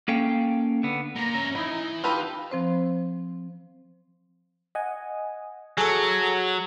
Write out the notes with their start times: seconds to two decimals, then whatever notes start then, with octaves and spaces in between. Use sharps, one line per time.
0.08 A#3 C#4 A4 F5 G5
0.83 D3 B3
1.16 A#2 A#5
1.34 C#4 E5
1.55 E3 D#4 E4
2.04 D#4 F4 G4 A4 B4
2.51 F3 C4 C5
4.75 D#5 F#5 G#5
5.77 F#3 G#4 A4